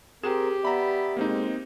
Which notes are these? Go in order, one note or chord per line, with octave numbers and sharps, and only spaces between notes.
C4 G4 G#4 A#4 E7
B3 D5 E5 A#5 B5
B2 G#3 A#3 C4 D#4